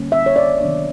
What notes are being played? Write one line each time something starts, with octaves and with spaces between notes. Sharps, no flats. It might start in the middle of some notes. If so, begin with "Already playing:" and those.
Already playing: D3 G3 A#3 C#4
E5
C#5
D5
C3 D#3 F#3 B3 D4